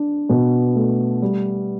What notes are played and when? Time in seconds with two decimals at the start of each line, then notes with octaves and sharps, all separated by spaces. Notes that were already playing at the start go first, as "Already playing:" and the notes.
Already playing: D4
0.29 B2
0.75 A3
1.22 G3